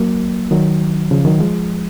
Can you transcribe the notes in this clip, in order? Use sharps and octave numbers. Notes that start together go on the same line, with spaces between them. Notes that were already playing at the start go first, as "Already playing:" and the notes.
Already playing: F#3 A#3
D#3 F#3
C#3 F3
D#3 F#3
F3 G#3